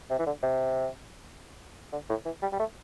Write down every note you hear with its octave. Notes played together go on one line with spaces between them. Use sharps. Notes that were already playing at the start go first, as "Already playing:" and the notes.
C3
E3
D3
C3
D3
A2
E3
G3
G3
A3